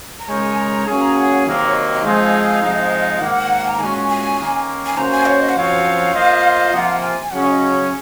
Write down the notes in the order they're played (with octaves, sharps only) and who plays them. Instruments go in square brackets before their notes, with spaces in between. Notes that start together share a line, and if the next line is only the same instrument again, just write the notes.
[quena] A#5
[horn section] C#3 G#3 D#4 A#4 C#5 [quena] G#5
[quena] A#5
[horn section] F#3 A#3 C#4 G#4 [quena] G#5
[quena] A#5
F#5
F#5
[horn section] C3 D#3 F#3 A#3 [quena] F5
[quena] C#5
D#5
D#5
[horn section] F3 G#3 C4 D#4 G#4 [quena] F5
[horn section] C3 F3 G#3 D#4
[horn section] G#2 D#3 A#3 [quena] F#5
[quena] A#5
[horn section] A#2 G#3 C#4 F#4 [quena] G#5
[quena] G#5
[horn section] D#3 A#3 C#4
[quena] G#5
[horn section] A#3 C#4 F#4 C5 [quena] A#5
[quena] G#5
C#5
D#5
F#5
[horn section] F#2 F3 C4 F#4 C#5 [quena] F5
[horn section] A#3 F4 C5 D#5
[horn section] C3 F3 A#3 F4 [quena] F#5
[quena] G#5
[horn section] C#3 F#3 C#4 G#4 [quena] F#5
[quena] C#5
D#5